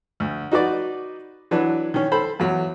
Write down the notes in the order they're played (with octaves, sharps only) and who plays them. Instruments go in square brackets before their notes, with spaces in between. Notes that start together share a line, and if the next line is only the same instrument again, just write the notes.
[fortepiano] D2
D#4 F#4 B4 D5
E3 F#3 D4 B4
D#3 C#4
A4 C5 B5
E2 F#3